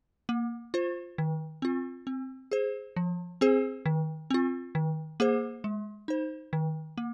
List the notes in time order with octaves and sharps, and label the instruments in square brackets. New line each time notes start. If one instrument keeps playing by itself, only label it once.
[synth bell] A#3
F4 C5
D#3
C4 F4
C4
G#4 C5
F3
C4 G#4 C5
D#3
C4 F4
D#3
A#3 G#4 C5
G#3
D#4 C5
D#3
A#3